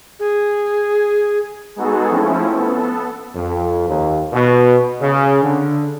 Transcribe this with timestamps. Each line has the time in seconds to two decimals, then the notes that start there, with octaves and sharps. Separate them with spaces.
0.20 G#4
1.76 G#3 B3 D#4 F#4 G#4 A4
2.10 F3 A3 C4 C#4 E4
2.54 B3 A4
3.35 F2
3.87 D#2
4.33 B2
5.01 C#3
5.42 D3